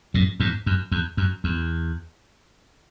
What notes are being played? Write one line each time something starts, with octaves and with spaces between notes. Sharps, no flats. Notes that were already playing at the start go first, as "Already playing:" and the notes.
F#2 A2
E2 G#2
F#2
E2
F#2
E2